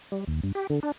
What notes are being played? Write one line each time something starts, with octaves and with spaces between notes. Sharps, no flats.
G3
D#2
G2
G4
D3
D4